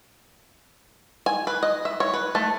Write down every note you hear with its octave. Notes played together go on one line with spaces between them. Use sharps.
G#5
B4
D#5
E5
C#5
B4
A3